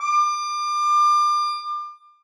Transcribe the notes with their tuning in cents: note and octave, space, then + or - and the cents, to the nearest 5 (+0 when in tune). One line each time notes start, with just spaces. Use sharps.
D6 +30